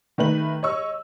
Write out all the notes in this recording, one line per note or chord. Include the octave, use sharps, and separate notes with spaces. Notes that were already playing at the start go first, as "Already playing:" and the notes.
D#3 A3 B4 F#7
C#5 D#5 C#6 E6